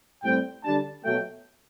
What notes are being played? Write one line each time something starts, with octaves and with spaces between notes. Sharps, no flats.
A2 G3 C4 G5
D3 G3 D4 A5
B2 F#3 A3 G5